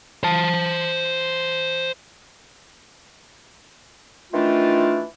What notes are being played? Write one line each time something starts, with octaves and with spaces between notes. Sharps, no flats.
C5 A5
D#3 E3 A3 D4 F4